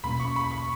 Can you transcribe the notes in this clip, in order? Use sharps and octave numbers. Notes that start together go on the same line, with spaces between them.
E2 B2 A#3 C#4 B5
C#6
B5
C#6